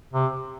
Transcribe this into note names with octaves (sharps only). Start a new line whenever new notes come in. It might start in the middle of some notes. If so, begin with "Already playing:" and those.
C3